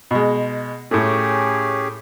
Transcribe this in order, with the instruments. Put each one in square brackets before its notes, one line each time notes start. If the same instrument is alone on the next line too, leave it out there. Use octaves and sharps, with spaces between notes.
[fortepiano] B2 G#3
[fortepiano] A2 A3 [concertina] C#4 G4 G#4